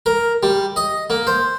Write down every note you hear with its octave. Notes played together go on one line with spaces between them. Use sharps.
A#4
G3
D#5
A#3
C5